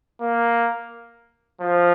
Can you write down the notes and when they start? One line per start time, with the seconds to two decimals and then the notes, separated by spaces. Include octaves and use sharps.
0.21 A#3
1.60 F3